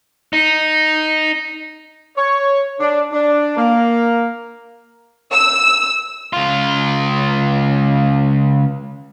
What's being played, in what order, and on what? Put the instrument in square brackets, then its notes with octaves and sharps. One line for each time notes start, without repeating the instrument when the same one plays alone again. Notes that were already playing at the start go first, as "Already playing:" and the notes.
[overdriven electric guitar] D#4
[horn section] C#5
D4
D4
A#3
[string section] E6
[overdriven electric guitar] C#2 F4